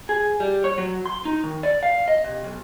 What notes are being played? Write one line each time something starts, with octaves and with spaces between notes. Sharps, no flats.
G#4
G3
C#5
F#3
C6
D#4
D#3
D5
F5
D#5
C3
B1